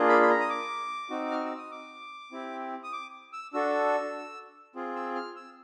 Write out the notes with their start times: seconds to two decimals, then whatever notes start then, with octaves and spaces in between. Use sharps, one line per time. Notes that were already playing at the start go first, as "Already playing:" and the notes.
Already playing: A#3 D4 F4 G#4
0.09 B5
0.22 B5
0.30 A#5
0.40 D#6
0.50 D6
1.10 C4 D#4 F#4
1.31 F6
1.45 E6
1.58 D#6
1.71 D6
2.32 C4 E4 G4
2.84 D#6
2.93 D6
3.33 E6
3.54 D4 F#4 A4 E6
4.76 C4 F4 G#4
4.96 E6
5.15 F6
5.36 E6